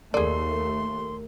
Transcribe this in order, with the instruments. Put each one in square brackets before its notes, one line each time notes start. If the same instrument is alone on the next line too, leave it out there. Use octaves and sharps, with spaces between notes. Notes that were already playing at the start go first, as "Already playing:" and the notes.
[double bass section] D#2 A3 [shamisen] G#4 D5 [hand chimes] A#4 [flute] C6